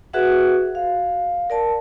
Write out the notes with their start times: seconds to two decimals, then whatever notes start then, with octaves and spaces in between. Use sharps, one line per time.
0.13 F#4 G#4 B4 E5 F#5
0.75 F5
1.50 A#4 D5 A5